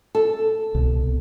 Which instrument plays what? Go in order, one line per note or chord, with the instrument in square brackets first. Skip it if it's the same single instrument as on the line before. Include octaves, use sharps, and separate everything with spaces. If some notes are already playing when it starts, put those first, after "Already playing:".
[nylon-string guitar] A4
[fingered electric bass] C2 B2